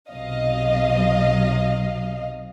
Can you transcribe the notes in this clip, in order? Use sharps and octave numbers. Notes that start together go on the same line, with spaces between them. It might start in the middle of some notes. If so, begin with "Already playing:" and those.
B1 C3 F#3 D#5 F5